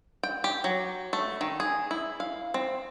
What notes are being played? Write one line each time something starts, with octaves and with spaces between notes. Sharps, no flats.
G5
G4
F#3
A3
D#3
G#4
E4
F5
C4